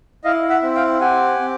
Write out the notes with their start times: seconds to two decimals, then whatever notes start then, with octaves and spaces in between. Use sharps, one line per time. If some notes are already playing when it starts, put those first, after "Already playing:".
0.24 E4 D#5 F5
0.49 E5 F#5
0.63 C4
0.75 F5 G5
1.00 G4 F#5 G#5
1.39 C4